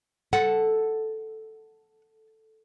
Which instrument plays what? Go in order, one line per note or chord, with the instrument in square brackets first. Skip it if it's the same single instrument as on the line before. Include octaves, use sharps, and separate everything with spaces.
[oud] A4 [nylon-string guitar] F#5